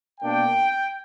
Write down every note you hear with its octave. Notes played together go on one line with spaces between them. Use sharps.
B2 A#3 D4 G5